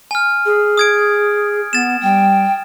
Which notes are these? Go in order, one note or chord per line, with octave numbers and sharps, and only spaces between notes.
G#5 F6
G#4
D#6 G#6 D7
B3 A6 E7
G3 G5